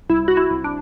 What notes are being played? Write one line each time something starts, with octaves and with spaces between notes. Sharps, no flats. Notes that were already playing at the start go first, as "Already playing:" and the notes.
C2 E4
F#4
E4
C2
D4